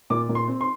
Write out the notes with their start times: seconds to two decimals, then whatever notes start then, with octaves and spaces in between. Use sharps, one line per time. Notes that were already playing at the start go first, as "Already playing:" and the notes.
0.10 A#2 D6
0.29 A#2
0.35 C6
0.48 C4
0.61 C6